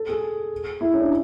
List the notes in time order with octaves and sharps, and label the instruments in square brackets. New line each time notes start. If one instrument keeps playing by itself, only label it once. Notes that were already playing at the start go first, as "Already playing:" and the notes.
Already playing: [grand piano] A4
G#4
E4
C#4
D4